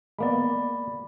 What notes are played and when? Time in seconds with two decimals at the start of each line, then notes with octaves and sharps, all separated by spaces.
0.19 G#3 A#3 B3 D5 B5